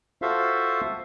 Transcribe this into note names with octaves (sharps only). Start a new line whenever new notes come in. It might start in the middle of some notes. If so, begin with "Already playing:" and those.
F4 F#4 A4 C5 E5 F5